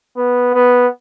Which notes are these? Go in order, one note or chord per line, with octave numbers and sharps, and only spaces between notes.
B3
B3